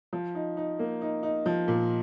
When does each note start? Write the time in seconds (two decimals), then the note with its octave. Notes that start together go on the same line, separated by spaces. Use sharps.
0.13 F3
0.35 D#4
0.57 D#4
0.79 A#3
1.02 D#4
1.23 D#4
1.46 F3
1.68 A#2